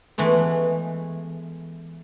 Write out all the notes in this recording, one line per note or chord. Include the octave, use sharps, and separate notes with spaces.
E3 G#3 A3 B3